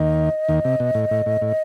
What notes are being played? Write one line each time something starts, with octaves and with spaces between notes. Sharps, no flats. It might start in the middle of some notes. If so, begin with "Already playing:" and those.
Already playing: D#2 D#3 D#5
D#2 D#3
C3
B2
A2
A2
A2
A2